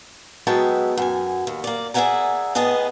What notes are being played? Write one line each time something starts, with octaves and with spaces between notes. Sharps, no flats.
F#3 G#3 B3 E5 G5 A5
F#2 G#5
D#2
A#3 D5
G#4 D5 E5 F#5 G#5 A#5
A2 B3 G#4 D#5 A5